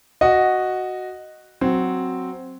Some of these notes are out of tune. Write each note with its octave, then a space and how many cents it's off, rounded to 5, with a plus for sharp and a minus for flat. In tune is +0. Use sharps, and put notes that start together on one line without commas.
F#4 +0 D#5 -5
F#3 +0 C4 +0